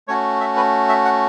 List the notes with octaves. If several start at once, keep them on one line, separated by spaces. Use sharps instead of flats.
A3 C#4 F#4 C#5
E5
B4
E5
F#5